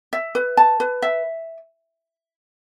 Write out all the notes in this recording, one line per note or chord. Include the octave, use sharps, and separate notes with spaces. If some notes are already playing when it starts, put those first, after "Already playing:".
E5
B4
A5
B4
E5